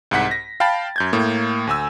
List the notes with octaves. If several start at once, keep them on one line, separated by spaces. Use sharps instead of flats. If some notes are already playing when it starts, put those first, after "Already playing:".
C2 G#2 F#5 B6
A#6
F5 G5 A5 B5 A6
F#2 G6 G#6
A2 A#3
D2 G#5 E6